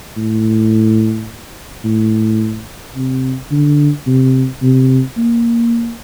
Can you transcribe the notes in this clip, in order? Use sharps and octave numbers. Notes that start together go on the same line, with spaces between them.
A2
A2
C3
D3
C3
C3
A#3